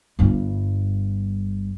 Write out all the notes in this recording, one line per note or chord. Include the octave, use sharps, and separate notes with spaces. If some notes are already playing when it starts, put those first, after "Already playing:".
G1 G2